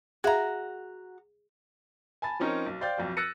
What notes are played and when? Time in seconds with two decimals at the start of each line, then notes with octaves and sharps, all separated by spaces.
0.24 F#4 G#4 E5 F5 A#5
2.22 G#5 A5 B5 A6
2.40 F3 C4 C#4 D#4 A#4 C#5
2.66 B1
2.81 C5 D5 F5 G5 G6 A6
2.98 B1 F2 F#4
3.17 E6 F#6 A6 A#6 C#7 D#7